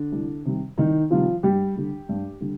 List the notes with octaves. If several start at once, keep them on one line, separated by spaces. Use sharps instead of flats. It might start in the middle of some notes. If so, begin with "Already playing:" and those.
Already playing: D3 D4
C2
C3 D#3 G3
C2 D#3 D#4
C3 D#3 F3 G3 F4
G2 G3 G4
D3 G3
G2
D3 G3